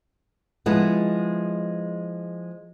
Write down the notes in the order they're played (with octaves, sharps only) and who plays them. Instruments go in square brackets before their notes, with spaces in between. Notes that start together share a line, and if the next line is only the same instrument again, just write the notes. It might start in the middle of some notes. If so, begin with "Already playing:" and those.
[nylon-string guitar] F3 G#3 B3 E4 B4